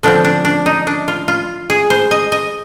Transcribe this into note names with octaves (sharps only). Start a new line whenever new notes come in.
D3 F3 C4 D4
D4
D4
D#4
D4
F4
F4
G#4
C5
D#5
D#5